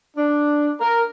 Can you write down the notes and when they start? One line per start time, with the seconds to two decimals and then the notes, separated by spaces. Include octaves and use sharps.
0.16 D4
0.80 A#4